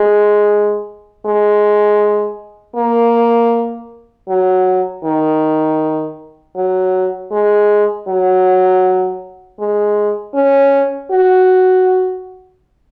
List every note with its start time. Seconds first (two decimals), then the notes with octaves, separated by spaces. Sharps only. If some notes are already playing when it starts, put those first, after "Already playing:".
Already playing: G#3
1.26 G#3
2.76 A#3
4.29 F#3
5.04 D#3
6.56 F#3
7.32 G#3
8.08 F#3
9.59 G#3
10.35 C#4
11.11 F#4